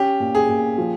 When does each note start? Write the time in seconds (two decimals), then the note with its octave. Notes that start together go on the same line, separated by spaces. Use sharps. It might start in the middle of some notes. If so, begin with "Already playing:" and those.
Already playing: C#4 G4
0.20 A#2
0.35 G#4
0.49 A#2
0.78 F3